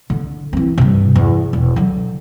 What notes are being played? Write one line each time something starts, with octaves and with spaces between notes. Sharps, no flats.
D3
E3 C4
G2 C3
E2
E1
D3 F#3